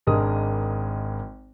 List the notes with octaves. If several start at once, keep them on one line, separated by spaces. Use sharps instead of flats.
G#1 G#3 D4 A#4 D#6